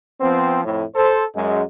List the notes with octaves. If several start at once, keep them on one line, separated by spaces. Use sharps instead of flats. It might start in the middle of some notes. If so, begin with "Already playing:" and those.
F3 B3 C4
F2 A2
A4 C5
F#2 G#3